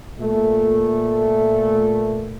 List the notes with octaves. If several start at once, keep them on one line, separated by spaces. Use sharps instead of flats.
A#2 A3